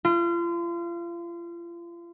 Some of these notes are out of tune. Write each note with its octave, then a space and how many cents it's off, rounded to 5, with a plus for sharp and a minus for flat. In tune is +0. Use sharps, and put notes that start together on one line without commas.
F4 -35